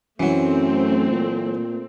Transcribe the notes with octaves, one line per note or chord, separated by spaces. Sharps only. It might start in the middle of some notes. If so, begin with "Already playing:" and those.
F#2 E3 F#3 A3 C4
A#2